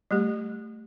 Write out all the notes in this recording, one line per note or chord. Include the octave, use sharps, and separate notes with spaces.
G3 A3 G4